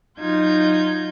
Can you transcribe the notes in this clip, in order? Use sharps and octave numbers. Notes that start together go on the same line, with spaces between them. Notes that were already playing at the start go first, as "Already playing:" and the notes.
F#3 D#4 F4 G6 G#6